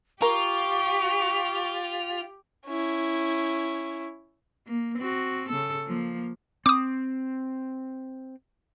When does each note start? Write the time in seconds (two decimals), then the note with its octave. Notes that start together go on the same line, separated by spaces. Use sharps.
0.22 F4 G4 A#4 C#6
2.67 C#4 E4
4.67 A#3
4.98 C4 F#4
5.49 C#3 A4
5.87 F3 A#3
6.66 C4 D6 D#6